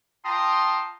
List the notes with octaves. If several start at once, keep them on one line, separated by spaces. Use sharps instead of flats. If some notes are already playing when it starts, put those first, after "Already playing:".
F4 G5 A5 A#5 C6 D#6